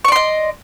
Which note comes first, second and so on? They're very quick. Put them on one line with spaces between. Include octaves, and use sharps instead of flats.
C#6 D5 C6 D#5